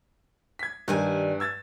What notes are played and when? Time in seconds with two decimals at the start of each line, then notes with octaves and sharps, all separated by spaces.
0.59 G#6 B6
0.88 G2 D#3 G3 G#5
1.40 E6 G#6 A6